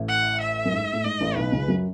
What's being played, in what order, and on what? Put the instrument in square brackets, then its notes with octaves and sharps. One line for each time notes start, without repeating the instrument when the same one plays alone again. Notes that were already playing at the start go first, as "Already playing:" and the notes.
Already playing: [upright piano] A1 A2
[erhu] F#5
E5
[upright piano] F#2
G#2
A2
[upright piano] G#2 [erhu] D#5
[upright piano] A1 A2
[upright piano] B1 B2 [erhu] B4
[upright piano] C#2 C#3
F#2 F#3